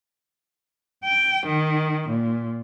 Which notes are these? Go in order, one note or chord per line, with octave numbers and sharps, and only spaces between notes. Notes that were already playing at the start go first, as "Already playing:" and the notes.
G5
D#3
A#2